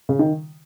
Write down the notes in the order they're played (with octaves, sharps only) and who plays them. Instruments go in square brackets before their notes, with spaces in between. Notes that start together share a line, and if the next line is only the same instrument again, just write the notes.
[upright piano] C#3
D#3